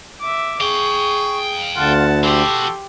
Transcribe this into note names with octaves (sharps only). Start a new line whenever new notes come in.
E5 D6
G#4 F5 G5 C#6
D2 D3 F4 F#5 A5
E3 F#4 G4 A4 C6